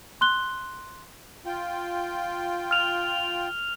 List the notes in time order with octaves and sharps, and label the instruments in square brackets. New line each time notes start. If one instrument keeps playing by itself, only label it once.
[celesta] C6 F#6 G7
[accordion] F4 G5
[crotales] F6 F7